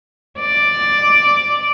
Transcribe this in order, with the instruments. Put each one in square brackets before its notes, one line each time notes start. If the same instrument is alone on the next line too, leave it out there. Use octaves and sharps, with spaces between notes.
[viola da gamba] D5